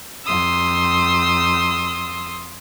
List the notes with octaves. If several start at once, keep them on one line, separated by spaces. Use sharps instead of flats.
F2 C6 D#6 E6